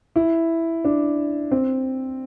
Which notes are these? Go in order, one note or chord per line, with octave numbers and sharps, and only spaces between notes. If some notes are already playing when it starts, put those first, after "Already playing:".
E4
D4
C4